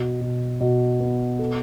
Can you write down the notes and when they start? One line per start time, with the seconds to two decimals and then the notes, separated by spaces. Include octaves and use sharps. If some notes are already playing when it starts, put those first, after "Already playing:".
Already playing: B2
0.21 B2
0.60 B2
1.00 B3
1.39 A4